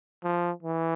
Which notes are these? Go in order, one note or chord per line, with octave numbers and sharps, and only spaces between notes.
F3
E3